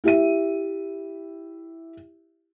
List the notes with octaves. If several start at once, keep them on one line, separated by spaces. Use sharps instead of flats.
E4 G4 E5 D#7